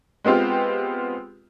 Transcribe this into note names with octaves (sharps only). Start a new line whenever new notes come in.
G#3 B3 C4 F4 G4